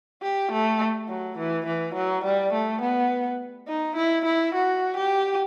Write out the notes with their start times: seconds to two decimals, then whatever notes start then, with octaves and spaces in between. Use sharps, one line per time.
0.22 G4
0.52 A3
1.09 F#3
1.38 E3
1.66 E3
1.95 F#3
2.24 G3
2.53 A3
2.81 B3
3.68 D#4
3.96 E4
4.25 E4
4.55 F#4
4.97 G4